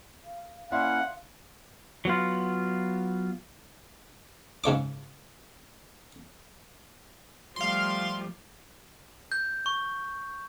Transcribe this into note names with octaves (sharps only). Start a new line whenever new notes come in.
F5
A#3 C#4 E4 D5 E5 F#5 C6
F#3 B3 F4
G#2 C#3 C#5 D6
F3 G3 A3 F5 C6
G6
C#6